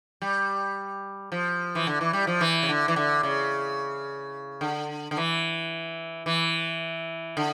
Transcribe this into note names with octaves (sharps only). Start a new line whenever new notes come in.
G3
F3
E3
D3
E3
G3
F3
E3
C#3
D3
E3
D3
C#3
D3
D3
E3
E3
D3